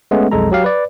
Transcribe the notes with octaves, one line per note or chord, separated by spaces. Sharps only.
G#3 A3 B3 C#4
B1 F2 G#3 A4 A#5
F#3 G4 F5
B4 D5